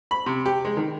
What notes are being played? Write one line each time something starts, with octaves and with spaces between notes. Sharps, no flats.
B5
C3
G4
G#3
D#3